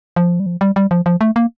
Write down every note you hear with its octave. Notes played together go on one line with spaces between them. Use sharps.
F3
G3
F3
G3
G3
F3
F3
A3
A#3